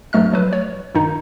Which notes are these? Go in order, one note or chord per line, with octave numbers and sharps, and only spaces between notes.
E2 G2 F#3 A3 D#5 F6
F3 F#3 B4
C#5
G2 D#3 D#4